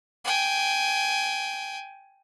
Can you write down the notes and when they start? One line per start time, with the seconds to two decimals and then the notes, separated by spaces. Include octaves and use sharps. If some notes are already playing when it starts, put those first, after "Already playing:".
0.25 G5 G#5